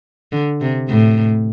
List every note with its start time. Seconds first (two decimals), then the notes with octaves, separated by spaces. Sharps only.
0.32 D3
0.61 C3
0.89 A2